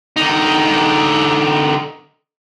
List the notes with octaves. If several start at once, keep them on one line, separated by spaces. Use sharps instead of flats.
D3 D#4